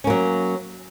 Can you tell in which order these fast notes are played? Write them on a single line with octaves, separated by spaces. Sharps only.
C#4 A#3 F#3